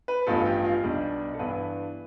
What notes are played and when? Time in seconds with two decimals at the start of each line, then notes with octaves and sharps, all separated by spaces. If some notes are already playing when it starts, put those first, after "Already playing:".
0.08 B4
0.27 A1 G2 F3 B3 A4
0.45 G4
0.64 F4
0.83 B1 B2 G3 D4
1.34 A4
1.39 G2 E3 B3 D4 B4